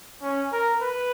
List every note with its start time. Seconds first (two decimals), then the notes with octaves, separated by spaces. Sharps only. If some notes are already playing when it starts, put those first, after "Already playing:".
0.22 C#4
0.53 A#4
0.82 B4